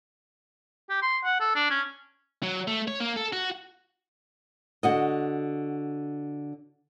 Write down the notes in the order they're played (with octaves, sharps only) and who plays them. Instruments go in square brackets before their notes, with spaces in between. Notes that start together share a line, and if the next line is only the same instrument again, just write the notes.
[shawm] G4
C6
F#5
A4
D4
C#4
[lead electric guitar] F#3
A3
C#5
A#3
A4
F#4
[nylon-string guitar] D3 F#4 D#5